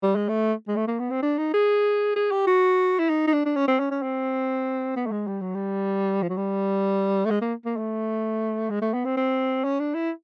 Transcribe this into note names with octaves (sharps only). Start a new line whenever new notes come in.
G3
G#3
A3
G#3
A3
A#3
B3
C4
D4
D#4
G#4
G#4
G4
F#4
E4
D#4
D#4
D4
D4
C#4
C4
C#4
C#4
C4
B3
A3
G#3
G3
F#3
G3
F3
F#3
G3
A3
G#3
A#3
A#3
A3
G#3
A3
B3
C4
C4
C#4
D4
E4